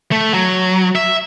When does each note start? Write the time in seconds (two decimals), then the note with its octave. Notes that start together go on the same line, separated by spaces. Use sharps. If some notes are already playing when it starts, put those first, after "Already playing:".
0.12 A3
0.34 F#3
0.95 E5